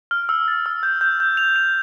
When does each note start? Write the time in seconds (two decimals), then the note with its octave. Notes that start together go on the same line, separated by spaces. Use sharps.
0.11 F6
0.29 E6
0.48 A6
0.66 E6
0.83 G6
1.01 G6
1.20 G6
1.37 F7
1.56 F7